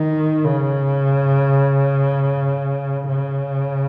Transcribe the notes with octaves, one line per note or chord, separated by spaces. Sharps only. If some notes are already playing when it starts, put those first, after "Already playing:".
Already playing: D#3
C#3
C#3